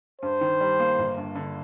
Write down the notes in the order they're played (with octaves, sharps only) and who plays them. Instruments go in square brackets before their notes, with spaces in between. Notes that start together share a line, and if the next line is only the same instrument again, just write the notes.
[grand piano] G2 [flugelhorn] C5
[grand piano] D#3
G3
A#3
G1
G2
D3